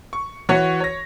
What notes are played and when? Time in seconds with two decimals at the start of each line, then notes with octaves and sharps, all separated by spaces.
0.13 C#6
0.49 E3 F#4 C#5 C#7
0.81 C#5 A#6